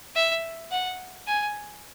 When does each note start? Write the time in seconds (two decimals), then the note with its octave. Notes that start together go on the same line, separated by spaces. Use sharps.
0.16 E5
0.71 F#5
1.27 G#5